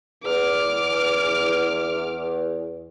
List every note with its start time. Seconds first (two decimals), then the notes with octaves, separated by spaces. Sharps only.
0.24 E2 D6 F6